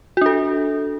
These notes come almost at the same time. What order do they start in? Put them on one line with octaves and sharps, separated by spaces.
F#4 D4 A4